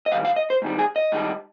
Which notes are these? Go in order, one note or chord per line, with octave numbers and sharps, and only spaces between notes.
D#5
G#2 D#3 G3 F5
F5
D#5
C5
G#2 D#3 G3
G#4
D#5
G#2 D#3 G3